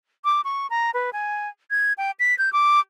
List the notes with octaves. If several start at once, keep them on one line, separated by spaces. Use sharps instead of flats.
D6
C#6
A#5
B4
G#5
G#6
G5
B6
G6
D6